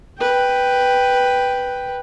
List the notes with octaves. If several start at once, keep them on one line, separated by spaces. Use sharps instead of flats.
B4 G5